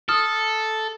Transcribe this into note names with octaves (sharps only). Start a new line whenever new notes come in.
A4 D#6 F6